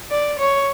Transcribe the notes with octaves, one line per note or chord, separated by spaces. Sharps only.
D5
C#5